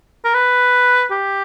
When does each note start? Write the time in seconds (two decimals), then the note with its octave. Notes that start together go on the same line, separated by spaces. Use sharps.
0.24 A#4
0.34 B4
1.11 G4